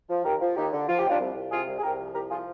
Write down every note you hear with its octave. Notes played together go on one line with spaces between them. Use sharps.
F3
D#2 G4 A#4
F3
D#2 D#4 G4
D3
F3 F4
G4
D#2 D4 F4
C2
C2
C3 F4 G#4
C2
G#4
C2 G4 A#4
F3
C2 G4 A#4
F3 F4 G#4